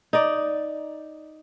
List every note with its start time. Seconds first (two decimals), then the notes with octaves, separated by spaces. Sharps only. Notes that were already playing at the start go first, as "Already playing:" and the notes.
0.13 D#4 D5